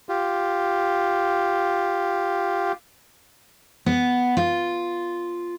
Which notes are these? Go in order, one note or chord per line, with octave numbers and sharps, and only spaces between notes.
F4 G4
B3
F4